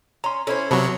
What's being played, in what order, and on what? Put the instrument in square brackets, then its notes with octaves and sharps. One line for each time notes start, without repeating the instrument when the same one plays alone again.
[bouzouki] C#4 [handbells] A#5 C6
[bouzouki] C#4 E4 C5 [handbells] A4
[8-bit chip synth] C3 F#3 [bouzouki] B3 [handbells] A5 B5 C#6